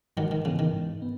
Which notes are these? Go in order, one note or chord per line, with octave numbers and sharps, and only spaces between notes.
G#2 D#3 F#3
D#3
C#3 E3 B3
D#3
G#2
B3